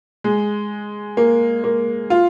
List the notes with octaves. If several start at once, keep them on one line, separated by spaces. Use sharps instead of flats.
G#3
A#3
A#3
F4